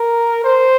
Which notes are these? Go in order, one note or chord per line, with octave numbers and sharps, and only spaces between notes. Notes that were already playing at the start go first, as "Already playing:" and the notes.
Already playing: A#4
C5